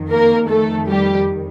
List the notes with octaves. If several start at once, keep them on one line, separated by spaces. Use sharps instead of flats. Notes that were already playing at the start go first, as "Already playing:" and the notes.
Already playing: F2 D#3
A#3 A#4
A3 A4
G3 G4